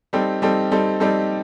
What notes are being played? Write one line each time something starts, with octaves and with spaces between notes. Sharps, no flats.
G3 C4 D#4 A4
G3 C4 D#4 A4
G3 C4 D#4 A4
G3 C4 D#4 A4